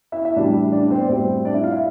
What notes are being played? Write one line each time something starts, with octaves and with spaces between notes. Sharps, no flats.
E4 E5
E4 E5
A2 E3 G3 D4 D5
D4 D5
C4 C5
D5
A2 G3 C4 C5
D4 D5
E4 E5
F4 F5
E4 E5